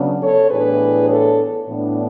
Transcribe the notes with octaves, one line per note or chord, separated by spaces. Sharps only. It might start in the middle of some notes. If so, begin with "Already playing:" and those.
Already playing: C#3 F#3 B3 D4
A4 C#5
A2 E3 B3 D4 G#4 B4
A4 C#5
A2 E3 B3 D4